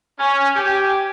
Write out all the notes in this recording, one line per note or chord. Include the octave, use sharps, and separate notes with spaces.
C#4
G4 G#5